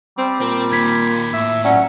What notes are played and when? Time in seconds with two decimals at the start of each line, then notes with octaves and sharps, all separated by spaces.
0.18 G3 C4
0.40 A#2 C4
0.72 D#3 A#3 G#6 B6
1.34 A2 E5
1.64 F#3 C#4 D5 F#5